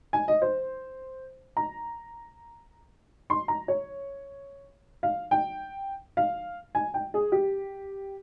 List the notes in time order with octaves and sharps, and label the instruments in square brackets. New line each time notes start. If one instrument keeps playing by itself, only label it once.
[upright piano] G#5
D#5
C5
A#5
C6
A#5
C#5
F5
G5
F5
G#5
G5
G#4
G4